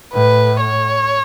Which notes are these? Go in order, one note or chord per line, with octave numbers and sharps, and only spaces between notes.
A2 B4
C#5